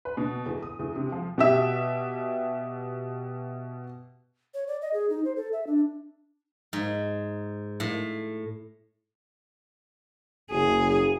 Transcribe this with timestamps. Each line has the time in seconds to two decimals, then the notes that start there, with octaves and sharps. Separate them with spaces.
0.05 B4
0.17 B2
0.46 E2
0.62 D#6
0.79 E2
0.96 C3
1.12 F3
1.38 B2 G4 E5
4.54 C#5
4.67 D5
4.82 D#5
4.94 G#4
5.10 D#4
5.25 C5
5.36 A4
5.53 E5
5.67 D4
6.73 G#2
7.80 A2
10.51 F#1 G#4